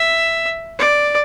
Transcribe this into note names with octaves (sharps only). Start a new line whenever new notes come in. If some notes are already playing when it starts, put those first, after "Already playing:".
Already playing: E5
D5